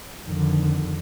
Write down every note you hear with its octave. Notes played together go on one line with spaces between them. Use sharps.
F2 D3 D#3